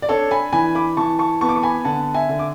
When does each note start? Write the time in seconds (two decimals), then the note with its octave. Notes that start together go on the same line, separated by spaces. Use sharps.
0.02 D5
0.09 D4 A4 C#5
0.31 G#5 B5
0.53 E3 G#5 B5
0.75 B5 D6
0.97 E3 A5 C#6
1.19 A5 C#6
1.41 B3 A5 C#6
1.49 D6
1.56 C#6
1.63 G#5 B5
1.85 D3 F#5 A5
2.14 E5 G#5
2.29 D3
2.39 D6